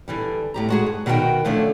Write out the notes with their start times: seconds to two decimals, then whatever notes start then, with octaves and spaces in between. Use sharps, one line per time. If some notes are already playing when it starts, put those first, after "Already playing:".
0.08 D3 E3 G3
0.54 A2 G4 A#5
0.69 G#3 F#4 G#4
0.86 G2
1.06 B2 D#3 F#4 G#4 A#4 G5
1.45 D3 F3 A3 C#4 D4